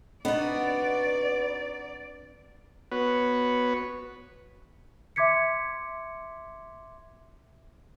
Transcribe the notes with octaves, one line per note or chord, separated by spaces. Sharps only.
B3 C4 D4 D#4 F#4 D5
B3 F#4 B4 C#5
E5 C6 D6 G#6 B6 C#7